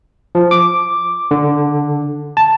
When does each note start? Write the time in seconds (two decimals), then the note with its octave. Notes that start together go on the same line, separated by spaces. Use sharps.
0.35 F3
0.51 D6
1.31 D3
2.37 A5